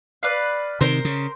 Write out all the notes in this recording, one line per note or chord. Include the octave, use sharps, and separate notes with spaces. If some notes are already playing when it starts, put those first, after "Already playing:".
B4 D5 F5
C3 D#3 A#4 C5
C#3